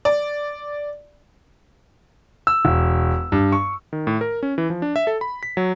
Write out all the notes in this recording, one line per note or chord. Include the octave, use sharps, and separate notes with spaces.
D5
E6
E1
G2
C#6
D#3
A2
A#4
C#4
E3
F3
D4
E5
A4
B5
B6
F#3